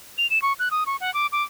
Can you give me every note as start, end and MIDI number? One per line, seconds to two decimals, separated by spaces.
0.18 0.29 101
0.30 0.41 100
0.42 0.53 85
0.59 0.69 90
0.71 0.84 87
0.86 0.96 85
1.00 1.13 78
1.14 1.27 86
1.32 1.43 86